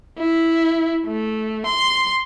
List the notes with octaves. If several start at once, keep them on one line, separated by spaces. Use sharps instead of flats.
E4
A3
C6